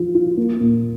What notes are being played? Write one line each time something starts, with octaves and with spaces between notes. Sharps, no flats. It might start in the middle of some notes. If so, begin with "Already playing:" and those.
Already playing: F3 F4
F4
A#3
A#2